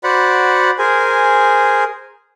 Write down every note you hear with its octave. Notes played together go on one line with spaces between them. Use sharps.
F#4 C5 D5 F#5 B5
G#4 A#4 C5 G#5